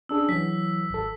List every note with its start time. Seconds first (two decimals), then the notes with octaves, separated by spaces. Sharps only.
0.09 C#4 D4 G#4 E6
0.29 E3 F#3 B6
0.90 G#1 A4